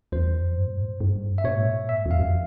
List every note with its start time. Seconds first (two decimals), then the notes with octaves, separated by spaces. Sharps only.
0.12 E2 C5
0.34 F2
0.56 G2
0.67 A#2
0.79 G#2
0.89 G2
1.01 G2
1.38 E5
1.44 A#2 C#5
1.56 G#2
1.67 A#2
1.89 G#2 E5
2.06 E2
2.11 F5
2.19 F2